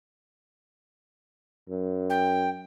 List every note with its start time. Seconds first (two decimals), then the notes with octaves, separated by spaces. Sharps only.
1.69 F#2
2.10 G5